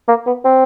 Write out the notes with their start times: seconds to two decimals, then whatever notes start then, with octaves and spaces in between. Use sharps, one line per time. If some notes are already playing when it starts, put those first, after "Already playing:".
0.08 A#3
0.27 B3
0.45 C4